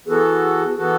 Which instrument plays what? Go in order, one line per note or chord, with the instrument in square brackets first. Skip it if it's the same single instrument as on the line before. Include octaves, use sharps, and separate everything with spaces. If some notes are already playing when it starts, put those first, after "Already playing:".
[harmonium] E3 B3 F#4 A4 [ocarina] G#4
[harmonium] E3 B3 F#4 A4